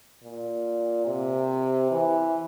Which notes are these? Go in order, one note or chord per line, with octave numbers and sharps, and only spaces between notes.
A#2
C3
E3